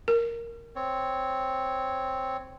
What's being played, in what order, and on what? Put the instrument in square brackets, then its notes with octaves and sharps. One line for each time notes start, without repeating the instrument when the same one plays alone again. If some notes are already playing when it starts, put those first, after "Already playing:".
[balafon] A#4
[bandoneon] C4 C#5